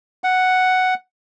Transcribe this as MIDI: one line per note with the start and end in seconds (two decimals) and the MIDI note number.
0.24 0.94 78